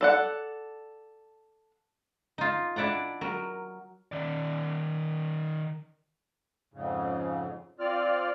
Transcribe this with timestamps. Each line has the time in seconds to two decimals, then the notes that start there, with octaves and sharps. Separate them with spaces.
0.01 A4 D5 F#5
2.38 D#4 F4
2.76 D4 E4 D5 F#5 A#5
3.21 F#3 A#4
4.12 D#3 D5
6.74 F2 G#2 C#3
7.80 C4 F4 D5 F6